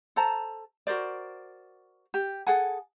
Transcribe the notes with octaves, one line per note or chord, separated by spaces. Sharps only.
A4 C5 A5 A#5
F#4 A#4 C5 D5
G4
G#4 A4 F#5 G#5